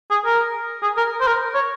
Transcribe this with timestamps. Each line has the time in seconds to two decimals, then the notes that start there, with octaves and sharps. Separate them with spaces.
0.10 G#4
0.26 A#4
0.82 G#4
0.97 A#4
1.21 C5
1.27 A#4
1.55 C#5